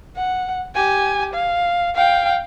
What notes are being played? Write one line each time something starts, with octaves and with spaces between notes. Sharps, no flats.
F#5
G4 G#5
F5
F5 G5